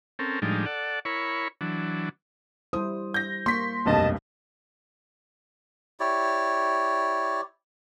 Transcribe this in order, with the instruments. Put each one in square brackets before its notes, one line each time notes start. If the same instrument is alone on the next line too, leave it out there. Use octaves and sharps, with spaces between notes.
[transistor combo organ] C4 C#4 A4 A#4
A2 F3 G3 G#3 D4 D#4
A4 D5 F#5
E4 A#4 C#5 B5 C#6
E3 F#3 D4
[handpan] G3 E4 C5 [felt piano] D#6
[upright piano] G6 A#6
[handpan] A#3 [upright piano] C6 B6 [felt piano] C#6
[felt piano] F1 B1 G2 [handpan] A#3 [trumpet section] D#5 A5
[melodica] E4 G4 C#5 D5